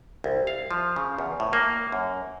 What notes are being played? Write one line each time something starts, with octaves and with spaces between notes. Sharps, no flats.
C2
F5
F3
C#3
E2
A2
A#3
F#2